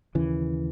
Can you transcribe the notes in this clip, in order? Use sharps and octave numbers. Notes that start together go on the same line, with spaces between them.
D#2 C#3 E3